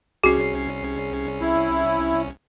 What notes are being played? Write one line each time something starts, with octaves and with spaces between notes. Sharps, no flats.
C2 C#4 F#4 G#4 C7
E4